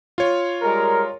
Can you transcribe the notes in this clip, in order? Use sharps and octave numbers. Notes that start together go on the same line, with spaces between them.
F4 C#5
G3 G#3 A#4